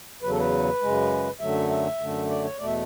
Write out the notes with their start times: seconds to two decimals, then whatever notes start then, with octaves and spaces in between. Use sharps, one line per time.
0.22 E2 C#3 F#3 B4
0.30 A4
0.39 B4
0.81 F#2 C#3 G#3
1.40 F#2 D3 F#3 A3 E5
1.70 E5
1.99 F#2 D3 A3
2.29 D5
2.44 C#5
2.58 E2 B2 A3 D5
2.66 E5